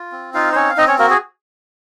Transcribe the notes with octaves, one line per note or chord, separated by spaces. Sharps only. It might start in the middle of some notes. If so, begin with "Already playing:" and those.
Already playing: F4
C4
D#4 F4 F5
C5
C4 C#4 C#5
F5
C4 D#4 D#5
C#4 C#5
A#3 F#4 A#4
G#4